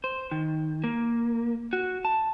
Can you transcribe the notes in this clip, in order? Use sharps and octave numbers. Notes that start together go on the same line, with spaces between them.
C5
D#3
A#3
F#4
A5